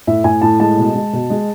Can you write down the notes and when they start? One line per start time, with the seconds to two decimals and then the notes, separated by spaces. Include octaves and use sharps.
0.07 A2 E5
0.24 A2 G#5
0.41 A2 A5
0.60 G#3 A5
0.77 B2
0.95 G#3
1.13 B2
1.30 G#3